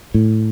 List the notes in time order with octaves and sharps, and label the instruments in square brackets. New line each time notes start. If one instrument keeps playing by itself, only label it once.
[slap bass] A2